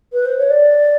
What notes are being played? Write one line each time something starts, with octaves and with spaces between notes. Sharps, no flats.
B4
C5
C#5
D5